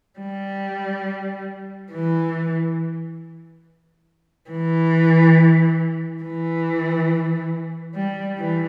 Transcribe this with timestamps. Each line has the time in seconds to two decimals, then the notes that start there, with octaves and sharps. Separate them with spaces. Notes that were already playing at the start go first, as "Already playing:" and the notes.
0.20 G3
1.92 E3
4.50 E3
6.23 E3
7.95 G3
8.38 E3